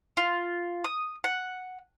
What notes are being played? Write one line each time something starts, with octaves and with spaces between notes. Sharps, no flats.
F4
D#6
F#5